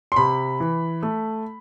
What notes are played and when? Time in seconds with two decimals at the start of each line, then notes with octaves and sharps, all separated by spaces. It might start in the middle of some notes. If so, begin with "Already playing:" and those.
0.12 C6
0.16 C3 B5
0.60 E3
1.03 A3